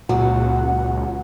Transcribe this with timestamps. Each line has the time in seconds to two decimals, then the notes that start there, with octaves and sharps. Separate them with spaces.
0.09 C#2 A#2 F#3 F#5